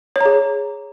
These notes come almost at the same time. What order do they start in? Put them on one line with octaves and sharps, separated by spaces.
C#5 A#5 G#4